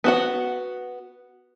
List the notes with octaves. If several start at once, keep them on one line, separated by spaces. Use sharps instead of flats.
B3 F#4 F#5